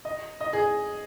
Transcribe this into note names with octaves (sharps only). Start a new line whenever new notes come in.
D#5
D#5
G#4